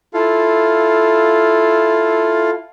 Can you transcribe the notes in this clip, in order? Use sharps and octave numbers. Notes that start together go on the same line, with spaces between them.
E4 F4 A4 F5